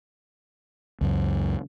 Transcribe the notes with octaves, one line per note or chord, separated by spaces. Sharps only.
C#2 F#2